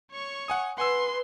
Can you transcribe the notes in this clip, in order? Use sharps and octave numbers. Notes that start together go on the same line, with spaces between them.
C#5 C#6
F#5 G#5 D#6
B4 F#5 G#5 C6 E6